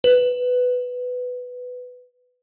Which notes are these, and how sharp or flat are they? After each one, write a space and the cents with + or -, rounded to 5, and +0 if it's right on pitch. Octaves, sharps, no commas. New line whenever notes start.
B4 +10